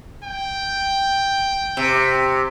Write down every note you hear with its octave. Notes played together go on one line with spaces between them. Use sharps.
G5
C3